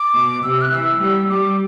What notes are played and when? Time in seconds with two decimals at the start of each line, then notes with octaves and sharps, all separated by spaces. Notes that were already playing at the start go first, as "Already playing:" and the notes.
Already playing: D6
0.14 B2
0.43 C3 E6
0.62 F#6
0.72 E3 E6
1.00 G3
1.29 G3 D6